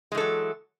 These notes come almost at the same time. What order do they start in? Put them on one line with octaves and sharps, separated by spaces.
G#3 E3 A4 F#3